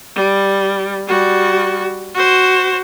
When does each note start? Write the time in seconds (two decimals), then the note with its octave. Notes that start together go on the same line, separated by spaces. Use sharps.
0.15 G3
1.07 G3 F#4
2.15 F#4 C5